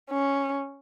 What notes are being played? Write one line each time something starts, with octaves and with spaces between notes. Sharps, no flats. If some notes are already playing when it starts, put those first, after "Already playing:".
C#4